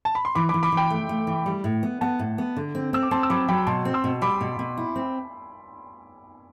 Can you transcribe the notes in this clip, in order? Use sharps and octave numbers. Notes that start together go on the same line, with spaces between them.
A5
B5
C6
E3 B5 D6
B5 D6
E3
B5 D6
E3
G5 B5
A3
A3
E3
G3
A2
B3
B3 F#5 A5
A2
B3
D3
C4
C4 E6
D6
C4 A5 C6
E6
F#3 B5 D6
F#3 G5 B5
B2 A5 C6
C4
C6 E6
B2
G3 B5 D6
B2
B2
E4
C4